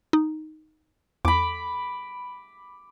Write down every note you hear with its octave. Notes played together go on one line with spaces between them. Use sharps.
D#4
E2 B5 D6